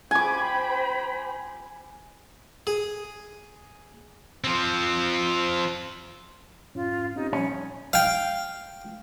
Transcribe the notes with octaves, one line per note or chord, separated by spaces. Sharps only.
C5 G5 G#5 B5 D6
G#4
F3 C4
F2 G#2 C#4 F4
C4 C#4 D#4 G4
A#2 F3 G3 C#4 C#5
F5 G5